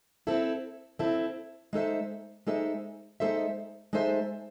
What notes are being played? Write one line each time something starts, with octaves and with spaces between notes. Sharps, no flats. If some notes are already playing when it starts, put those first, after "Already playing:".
C4 E4 A4
C4 E4 A4
G#3 D#4 A4 C5 E5
G#3 D#4 A4 C5 E5
G#3 D#4 A4 C5 E5
G#3 D#4 A4 C5 E5